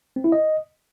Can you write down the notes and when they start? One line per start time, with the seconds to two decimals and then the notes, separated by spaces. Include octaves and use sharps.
0.16 C4
0.24 E4
0.32 D#5